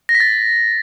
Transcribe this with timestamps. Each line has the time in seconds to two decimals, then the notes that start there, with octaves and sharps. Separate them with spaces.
0.09 A#6
0.15 B6
0.20 A6